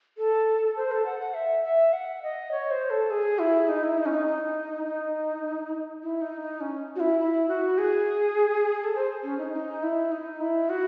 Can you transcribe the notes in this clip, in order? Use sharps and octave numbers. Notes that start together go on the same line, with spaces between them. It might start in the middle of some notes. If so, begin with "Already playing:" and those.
A4
C5
A4
F#5
F#5
E5
E5
F#5
D#5
C#5
C5
A4
G#4
E4
D#4
E4
D#4
C#4
D#4
D#4
D#4
E4
D#4
D#4
C#4
F#4
E4
E4
F#4
G#4
A4
C5
C#4
D#4
D#4
E4
D#4
E4
F#4